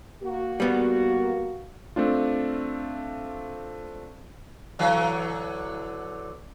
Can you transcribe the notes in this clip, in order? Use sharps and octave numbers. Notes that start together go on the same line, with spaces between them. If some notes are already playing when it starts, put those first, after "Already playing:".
A#3 F#4
G3 B3
A3 C4 D4 F4
D3 E3 F#3